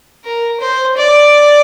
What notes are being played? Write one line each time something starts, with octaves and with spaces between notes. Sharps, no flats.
A#4
C5
D5